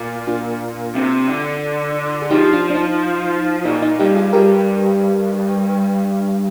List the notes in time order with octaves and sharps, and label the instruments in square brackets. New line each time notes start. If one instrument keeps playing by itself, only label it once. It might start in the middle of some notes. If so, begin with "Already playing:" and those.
Already playing: [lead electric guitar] A#2
[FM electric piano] D4 F4
[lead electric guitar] C3
D3
[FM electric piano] G#4
[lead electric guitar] F3 [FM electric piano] D#4 G4
[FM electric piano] D4 F4
D4
D#4
[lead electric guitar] A#2 [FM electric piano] D#4
[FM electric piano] D#4
[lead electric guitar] G2 [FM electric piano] D#4 G4
[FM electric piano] F4 G#4
[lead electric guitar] G2 [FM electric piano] G4 A#4